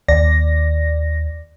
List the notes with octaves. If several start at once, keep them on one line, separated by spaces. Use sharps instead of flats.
D#2 D5 A#6